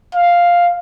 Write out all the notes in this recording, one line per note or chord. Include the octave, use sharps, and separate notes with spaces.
F5